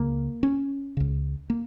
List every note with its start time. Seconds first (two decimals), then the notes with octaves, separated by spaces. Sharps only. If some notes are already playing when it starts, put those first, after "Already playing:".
Already playing: C#2 C#3 A#3
0.43 C#4
0.97 C#2 C#3
1.50 A#3